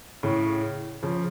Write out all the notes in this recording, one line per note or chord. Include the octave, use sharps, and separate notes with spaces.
A2 C#3
C#3 F3